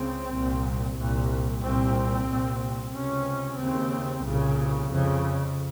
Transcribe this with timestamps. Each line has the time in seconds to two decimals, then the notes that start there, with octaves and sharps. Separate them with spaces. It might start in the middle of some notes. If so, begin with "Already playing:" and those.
Already playing: C#2 C#3 C4
0.31 C2 A#2
0.97 C2 A#2
1.62 C2 A#2 C4
2.28 C2 A#2
2.94 C#2 C3 C#4
3.59 D#2 C#3 C4
4.25 C2 A#2 C#3
4.91 F2 C#3